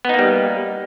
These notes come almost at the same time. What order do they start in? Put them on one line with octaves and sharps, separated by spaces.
B3 D#4 A#3 G3